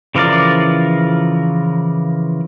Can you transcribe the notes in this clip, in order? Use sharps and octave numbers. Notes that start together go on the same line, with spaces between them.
C#3 E3 F3 A#4 D5